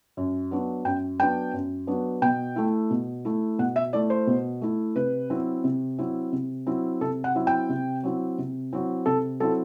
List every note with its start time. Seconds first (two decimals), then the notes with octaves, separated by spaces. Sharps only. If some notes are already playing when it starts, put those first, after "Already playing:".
0.17 F#2
0.51 F#3 B3 D4
0.85 F#2 G5
1.19 F#3 B3 D4 G5
1.53 F#2
1.87 F#3 B3 D4
2.22 B2 G5
2.56 A3 E4
2.90 B2
3.25 A3 E4
3.59 B2 F#5
3.76 E5
3.93 A3 E4 D5
4.10 C5
4.27 B2
4.61 A3 E4
4.96 C3 B4
5.30 F#3 C4 E4
5.64 C3
5.98 F#3 C4 E4
6.32 C3
6.67 F#3 C4 E4
7.01 C3 A4
7.24 F#5
7.35 F#3 C4 E4
7.47 G5
7.69 C3
8.03 F#3 C4 E4
8.38 C3
8.73 F#3 C4 E4
9.06 C3 A4
9.40 F#3 C4 E4 A4